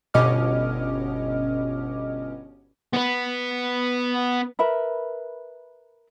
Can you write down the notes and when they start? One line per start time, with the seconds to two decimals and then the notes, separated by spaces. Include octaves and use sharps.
0.14 G1 B2 C#4 D#5 D6 F6
2.93 B3 B4
4.59 A#4 B4 E5 B5